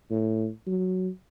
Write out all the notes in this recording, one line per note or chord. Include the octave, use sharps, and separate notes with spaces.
A2
F#3